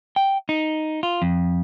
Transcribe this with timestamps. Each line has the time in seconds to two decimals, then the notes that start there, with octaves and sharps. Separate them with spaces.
0.16 G5
0.49 D#4
1.03 F4
1.22 F2